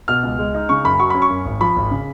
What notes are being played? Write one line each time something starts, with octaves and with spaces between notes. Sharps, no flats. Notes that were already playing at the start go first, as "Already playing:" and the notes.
B2 F6
C#2
G#3
D#4
C#3 C#6
F#2 B5
F#3 C#6
C#4 B5
C#6
F#2
G#1
F3 B5
G#1
C#3